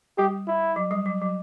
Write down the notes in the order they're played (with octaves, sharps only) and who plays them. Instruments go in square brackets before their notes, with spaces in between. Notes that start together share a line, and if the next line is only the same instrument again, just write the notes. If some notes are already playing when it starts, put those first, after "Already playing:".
[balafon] G3 [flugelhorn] G4
[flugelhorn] E4
[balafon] F#3
G3
F#3
F#3